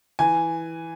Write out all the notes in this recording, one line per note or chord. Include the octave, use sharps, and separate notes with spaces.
E3 G#5